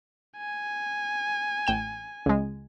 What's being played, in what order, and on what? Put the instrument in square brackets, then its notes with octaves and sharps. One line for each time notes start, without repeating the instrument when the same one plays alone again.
[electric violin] G#5
[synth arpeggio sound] A1 G5 E7
C#2 G#3